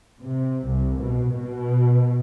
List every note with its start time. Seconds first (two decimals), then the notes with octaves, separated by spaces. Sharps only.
0.22 C3
0.67 C2
1.00 B2
1.33 B2